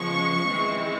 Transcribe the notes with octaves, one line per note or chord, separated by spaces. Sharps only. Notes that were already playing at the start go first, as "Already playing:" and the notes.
Already playing: C#3 F3 G#3 B3 C#6
E3 G#3 C4